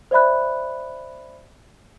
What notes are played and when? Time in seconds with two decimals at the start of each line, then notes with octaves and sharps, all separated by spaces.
0.11 C5 D5 E5 B5 F#6